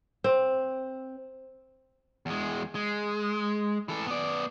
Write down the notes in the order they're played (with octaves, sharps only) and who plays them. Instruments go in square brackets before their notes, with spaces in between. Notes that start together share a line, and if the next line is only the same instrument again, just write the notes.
[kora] C4
[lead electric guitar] E2 G#3
G#3
E3 A4
B3 D5